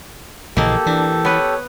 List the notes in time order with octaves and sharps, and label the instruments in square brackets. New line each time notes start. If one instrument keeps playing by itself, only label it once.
[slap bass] A#1 C#3 E3 [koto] A#3 [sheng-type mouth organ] G4 A4 [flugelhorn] D#5
[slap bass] E3 [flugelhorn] D4
[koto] B3 B4 [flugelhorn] C#5